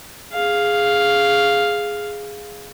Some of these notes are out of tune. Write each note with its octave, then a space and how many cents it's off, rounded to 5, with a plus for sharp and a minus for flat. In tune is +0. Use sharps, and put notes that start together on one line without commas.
G#4 +0 F5 +0